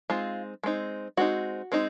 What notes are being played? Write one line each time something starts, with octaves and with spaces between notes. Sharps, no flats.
G#3 C4 D#4 F4
G#3 C4 D#4
G#3 C4 D#4 F#4
G#3 C4 D#4